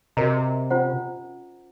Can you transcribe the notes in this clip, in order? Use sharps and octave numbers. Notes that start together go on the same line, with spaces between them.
C3 F#4 A#4 D#5 A#5
C#4 F4 C5 F#5 A#5